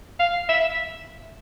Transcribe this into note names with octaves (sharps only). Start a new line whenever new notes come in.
F5
E5